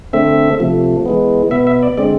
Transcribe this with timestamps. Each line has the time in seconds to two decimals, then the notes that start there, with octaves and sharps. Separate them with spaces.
0.13 D3 A3 C4 E5
0.60 C3 F3 A3
1.06 E3 G#3 B3
1.51 B2 B3 E5
1.67 E5
1.83 D5
1.97 D3 G#3 C4 D5